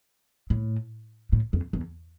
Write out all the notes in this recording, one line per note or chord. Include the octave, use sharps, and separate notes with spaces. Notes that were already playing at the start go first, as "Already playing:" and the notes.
A2
A2
F2
E2